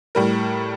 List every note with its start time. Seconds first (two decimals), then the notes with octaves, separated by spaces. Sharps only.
0.15 A2 G3 A#4